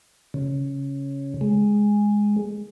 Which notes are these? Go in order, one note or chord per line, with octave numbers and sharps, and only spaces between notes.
C#3
G#3